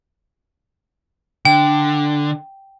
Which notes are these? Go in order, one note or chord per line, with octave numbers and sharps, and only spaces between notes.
D3 G5